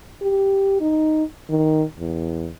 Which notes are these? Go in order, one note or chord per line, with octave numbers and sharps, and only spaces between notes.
G4
D#4
D#3
E2